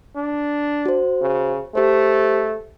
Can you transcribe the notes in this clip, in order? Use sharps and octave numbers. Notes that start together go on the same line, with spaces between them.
D4
F#4 C5
C#3
A3 G4 C5